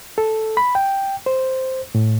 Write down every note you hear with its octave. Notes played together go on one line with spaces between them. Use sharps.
A4
B5
G5
C5
A2